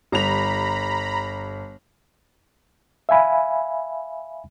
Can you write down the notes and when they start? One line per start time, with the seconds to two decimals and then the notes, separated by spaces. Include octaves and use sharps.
0.12 G1 A#5 B5 F7
3.09 E5 F5 G#5 B5